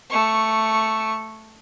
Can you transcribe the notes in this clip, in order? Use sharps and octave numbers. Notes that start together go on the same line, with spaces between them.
A3 C#6